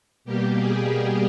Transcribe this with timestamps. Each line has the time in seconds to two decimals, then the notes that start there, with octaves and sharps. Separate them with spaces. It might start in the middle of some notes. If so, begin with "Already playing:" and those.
0.25 B2 G3 A#3 G4
0.57 G#4